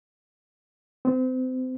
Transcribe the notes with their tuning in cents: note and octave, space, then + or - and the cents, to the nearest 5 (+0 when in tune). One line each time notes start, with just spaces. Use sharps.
C4 -30